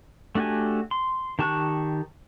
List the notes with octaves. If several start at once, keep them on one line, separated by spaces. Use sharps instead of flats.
A3 D4 F#4 G4 G#5
C6
D#3 G4 A5 C#6 F#6